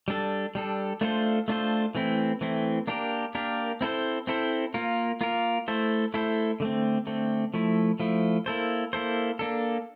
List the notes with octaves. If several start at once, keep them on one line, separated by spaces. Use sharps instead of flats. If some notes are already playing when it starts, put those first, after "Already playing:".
G3 D4 A4
G3 D4 A4
A3 D4 F4 A4 C5
A3 D4 F4 A4 C5
E3 A3 C4 E4
E3 A3 C4 E4
A#3 D4 G4 A#4
A#3 D4 G4 A#4
C4 E4 A4 C5
C4 E4 A4 C5
A#3 F4 A#4
A#3 F4 A#4
A3 E4 A4 C5
A3 E4 A4 C5
D3 A3 C4
D3 A3 C4
F3 A3 E4
F3 A3 E4
A#3 E4 A4 C5
A#3 E4 A4 C5
A#3 D4 A4